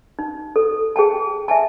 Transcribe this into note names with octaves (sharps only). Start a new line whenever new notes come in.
D#4
A4
G#4 G5 A5
E5 G#5 A5